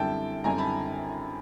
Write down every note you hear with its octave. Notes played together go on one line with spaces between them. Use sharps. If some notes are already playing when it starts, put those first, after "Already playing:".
Already playing: F#2 D3 G3 C4 E4 G5 A5
F#2 D3 G3 C4 E4 G#5 A#5
A5 B5